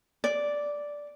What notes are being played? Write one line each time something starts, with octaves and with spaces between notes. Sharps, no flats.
D5